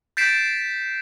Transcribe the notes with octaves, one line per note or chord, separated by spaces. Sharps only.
G6 A6 B6 C7 D7 E7